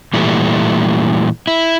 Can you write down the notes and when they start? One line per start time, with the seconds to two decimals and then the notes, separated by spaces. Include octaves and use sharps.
0.14 A#2 E3 G3 A3
1.47 E4